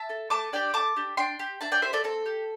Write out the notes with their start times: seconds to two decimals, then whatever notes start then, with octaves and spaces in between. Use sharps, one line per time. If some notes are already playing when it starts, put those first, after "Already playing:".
Already playing: E5 A5
0.09 A4
0.30 A3 A5 D6
0.52 D4 G4 D5 G5
0.74 A3 A5 D6
0.96 D4 G4
1.17 D4 G5 C6
1.39 G4
1.61 D4 E5 A5
1.72 D5 G5
1.82 G4 C5 E5
1.93 A4 D5
2.04 C4 A4
2.26 G4